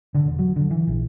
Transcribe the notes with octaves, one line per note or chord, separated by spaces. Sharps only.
D3
E1
F#3
D3
E3
A#1